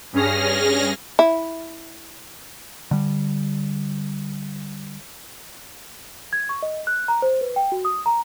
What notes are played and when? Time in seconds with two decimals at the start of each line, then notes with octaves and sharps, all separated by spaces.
0.13 G2 C#4 G#4 F6 A#6
1.19 E4
2.91 D3 G3
6.33 G#6
6.49 C#6
6.63 D#5
6.87 F#6
7.08 A#5
7.22 C5
7.41 B4
7.56 G5
7.72 F#4
7.85 D#6
8.06 A#5